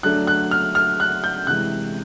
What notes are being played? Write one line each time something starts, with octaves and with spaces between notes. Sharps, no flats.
D3 F#3 A3 D4 F#6
F#6
F6
F6
F#6
G6
C3 E3 G#3 F#6